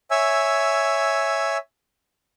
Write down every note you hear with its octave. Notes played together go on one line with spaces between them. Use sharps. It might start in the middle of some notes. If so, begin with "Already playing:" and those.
C#5 E5 G#5 E6